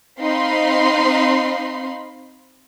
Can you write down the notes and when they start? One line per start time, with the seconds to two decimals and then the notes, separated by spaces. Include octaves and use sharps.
0.19 C4 D#4 F5 B5 C6